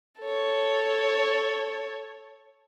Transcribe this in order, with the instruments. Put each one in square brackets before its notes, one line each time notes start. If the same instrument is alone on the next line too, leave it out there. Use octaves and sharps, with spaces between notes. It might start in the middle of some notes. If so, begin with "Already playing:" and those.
[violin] A4 C#5